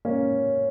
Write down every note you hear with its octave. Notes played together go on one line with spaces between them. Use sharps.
A#3 C#4